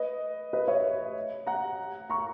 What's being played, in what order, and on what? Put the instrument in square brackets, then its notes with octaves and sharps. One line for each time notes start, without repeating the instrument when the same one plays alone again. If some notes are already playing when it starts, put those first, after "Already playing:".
Already playing: [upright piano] B4 D#5
B4 D#5
C#5 E5
F#5 A#5
A#5 C#6